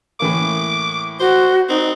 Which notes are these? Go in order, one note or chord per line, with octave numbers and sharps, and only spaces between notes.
A2 E3 A#3 D6
F#4 C5
C4 D#4